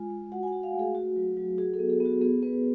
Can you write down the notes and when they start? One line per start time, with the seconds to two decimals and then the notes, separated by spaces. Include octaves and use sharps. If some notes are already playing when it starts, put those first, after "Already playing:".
Already playing: G#3 F4 G#5
0.10 G#3
0.32 F#4 F#5
0.43 G#5
0.47 F#5
0.52 F#4
0.63 F5
0.74 A3
0.79 G#4
0.95 F#4
1.16 F#3
1.37 F#3
1.58 F#4 G#4
1.74 A4
1.79 B3
1.89 G#4
2.00 B3
2.05 F#4
2.21 B3 G#4
2.43 B3 B4